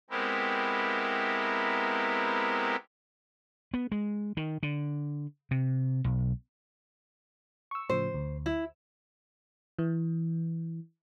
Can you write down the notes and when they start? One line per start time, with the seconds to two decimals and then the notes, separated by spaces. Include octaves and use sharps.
0.10 G#3 B3 C4 E4 G4 A#4
3.74 B3
3.92 G#3
4.37 D#3
4.63 D3
5.51 C3
6.04 B1
7.71 C#6 E6
7.90 A2 C#3 F3 C5
8.14 D2
8.46 E4
9.79 E3